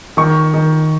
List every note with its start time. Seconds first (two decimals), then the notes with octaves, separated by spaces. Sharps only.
0.17 D#3 C#6
0.54 D#3